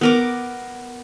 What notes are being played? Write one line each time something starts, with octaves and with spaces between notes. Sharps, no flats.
B3 A#4 D6